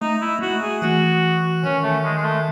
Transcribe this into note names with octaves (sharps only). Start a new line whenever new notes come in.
A3 D#4
E4
A3 F#4
G#4
E3 F#4
D#3 C#4
A3
G#3
G#3
A3